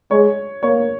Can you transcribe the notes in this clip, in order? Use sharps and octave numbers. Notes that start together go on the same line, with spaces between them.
G#3 C#5
A#3 C#5